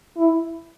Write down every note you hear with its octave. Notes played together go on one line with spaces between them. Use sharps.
E4